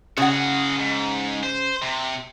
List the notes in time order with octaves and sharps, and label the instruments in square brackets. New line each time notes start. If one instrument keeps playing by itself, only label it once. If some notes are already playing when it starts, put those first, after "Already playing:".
[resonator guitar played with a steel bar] C#3 F#5 [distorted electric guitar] F#4 G#4
[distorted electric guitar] G#2
C5
C3